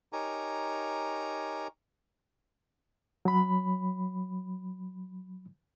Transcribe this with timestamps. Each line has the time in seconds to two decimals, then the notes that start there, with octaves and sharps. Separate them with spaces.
0.13 D#4 G4 A#4 C#5 G#5 A#5
3.25 F#3 B5